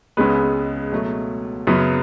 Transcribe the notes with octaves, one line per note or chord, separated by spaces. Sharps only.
C#2 C#3 G#3 B3 B4
B2 F#3 A3
F#2 C#3 F#3 B3